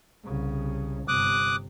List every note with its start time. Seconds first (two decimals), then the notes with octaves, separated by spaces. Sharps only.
0.24 C2 C#3
1.08 G1 C3 D6 D#6 F#6